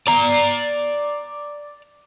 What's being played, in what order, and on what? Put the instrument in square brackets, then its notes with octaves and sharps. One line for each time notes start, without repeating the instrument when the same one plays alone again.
[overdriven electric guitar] D5 A#5